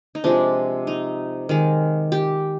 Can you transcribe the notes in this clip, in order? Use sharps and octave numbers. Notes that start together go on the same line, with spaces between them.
D#4
C3 F3 G#3 D4
D#4
D#3 G#3
G4